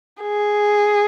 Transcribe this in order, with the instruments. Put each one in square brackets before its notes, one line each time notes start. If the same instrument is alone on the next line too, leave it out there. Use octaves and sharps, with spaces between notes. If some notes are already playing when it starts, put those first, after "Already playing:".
[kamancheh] G#4